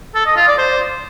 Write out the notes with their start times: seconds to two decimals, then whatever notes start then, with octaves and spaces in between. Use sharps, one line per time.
0.15 A4
0.26 D#5
0.37 F4
0.48 D5
0.58 C5